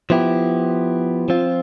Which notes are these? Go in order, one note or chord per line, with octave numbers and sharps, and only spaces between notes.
F3 B3 E4 G4
F3 C4 F4